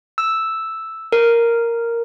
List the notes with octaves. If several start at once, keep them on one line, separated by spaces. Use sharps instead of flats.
E6
A#4